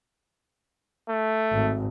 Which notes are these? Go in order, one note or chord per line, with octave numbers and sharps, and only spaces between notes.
A3
G#1